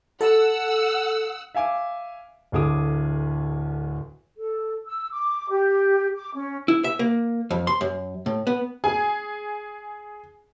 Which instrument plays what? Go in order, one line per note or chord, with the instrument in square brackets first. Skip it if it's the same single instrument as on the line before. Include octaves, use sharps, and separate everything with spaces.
[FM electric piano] A4 [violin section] F#5 E6
[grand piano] E5 F5 G#5 D6
D1 D2 G#4 D6 D#6
[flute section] A4
E6
D6
G4
D6
C#4
[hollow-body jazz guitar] E4
E5
A#3
F2
C6
F#2
A2
B3
[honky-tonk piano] G#4 G#5